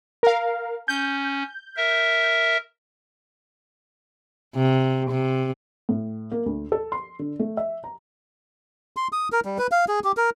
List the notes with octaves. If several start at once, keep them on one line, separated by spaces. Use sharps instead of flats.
A#4 F5
C#4 G6
A#4 E5
C3
C3
A2
A#3
D2
A4
C6
D3
A3
E5
A#5
C6
D#6
A#4
G3
B4
F5
G#4
G4
A#4